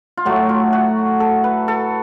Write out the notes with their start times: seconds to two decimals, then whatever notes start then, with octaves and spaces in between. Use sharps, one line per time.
0.17 F4
0.25 A2 F#3 A3 F#4
0.49 F4
0.73 F#4
1.20 A4
1.44 B4
1.68 A4